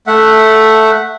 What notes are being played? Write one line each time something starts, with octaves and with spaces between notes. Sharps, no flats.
A3 E5 F#5